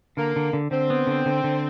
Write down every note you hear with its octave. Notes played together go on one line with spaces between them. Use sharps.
D3 A#3
D3
D3
D3 C4
B3
D3
D3
D3